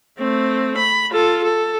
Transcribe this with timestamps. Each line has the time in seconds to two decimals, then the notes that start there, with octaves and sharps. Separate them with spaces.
0.19 A3 C4
0.77 B5
1.11 F4 A4
1.44 A4